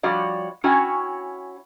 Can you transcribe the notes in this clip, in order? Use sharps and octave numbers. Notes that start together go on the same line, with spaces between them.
F3 G3 F#4 C#5 D5
C#4 E4 F#4 C#5 G5 G#5